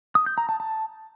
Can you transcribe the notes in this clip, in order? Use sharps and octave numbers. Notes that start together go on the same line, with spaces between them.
D#6
G6
A#5
A5
A5